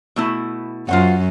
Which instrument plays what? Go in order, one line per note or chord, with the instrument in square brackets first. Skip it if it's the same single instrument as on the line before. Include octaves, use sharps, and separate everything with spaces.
[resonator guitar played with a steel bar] B2 A3 E4
[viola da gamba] F#2 [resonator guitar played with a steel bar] F4 C5 F#5